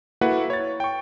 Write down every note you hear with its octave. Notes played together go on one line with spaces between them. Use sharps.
A#3 E4 F#4 A4 B4 F#5
C#5 A6
G5 C#6